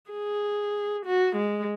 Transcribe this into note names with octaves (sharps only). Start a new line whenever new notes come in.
G#4
F#4
G#3